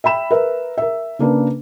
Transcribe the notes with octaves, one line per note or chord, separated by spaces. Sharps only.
E5 G5 B5 E7
A#4 B4 E5
A#4 E5
C#3 A#3 D4 B4